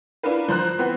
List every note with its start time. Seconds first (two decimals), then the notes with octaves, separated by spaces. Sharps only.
0.23 D4 E4 F4 A#4 B4
0.48 F3 C5 A#5 F#6
0.78 E3 B3 C4